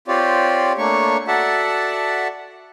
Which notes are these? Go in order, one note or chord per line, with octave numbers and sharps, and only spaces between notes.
C4 F4 G4 C#5 D5
A3 A#3 D4 C#5 C#6
F#4 A4 D5 E5 F#5 A5